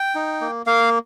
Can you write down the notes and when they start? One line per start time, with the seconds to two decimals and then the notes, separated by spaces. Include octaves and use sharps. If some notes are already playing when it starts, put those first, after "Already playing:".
Already playing: G5
0.15 D#4
0.41 A#3
0.66 A#3 F5